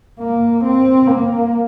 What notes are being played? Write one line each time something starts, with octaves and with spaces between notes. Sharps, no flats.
A#3
C4
A#3